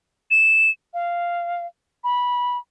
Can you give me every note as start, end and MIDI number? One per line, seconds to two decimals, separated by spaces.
0.31 0.70 100
0.94 1.66 77
2.04 2.58 83